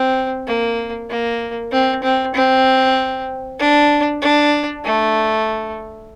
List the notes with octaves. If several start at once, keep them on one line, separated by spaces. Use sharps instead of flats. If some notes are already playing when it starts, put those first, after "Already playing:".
Already playing: C4
A#3
A#3
C4
C4
C4
D4
D4
A3